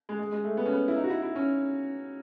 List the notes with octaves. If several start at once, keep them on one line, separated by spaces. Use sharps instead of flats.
G#3
G#3
G#3
A3
B3
C#4
B3
E4
D#4
F#4
E4
E4
C#4